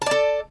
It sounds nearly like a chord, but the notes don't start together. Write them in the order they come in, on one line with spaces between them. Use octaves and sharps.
A5 D5 A4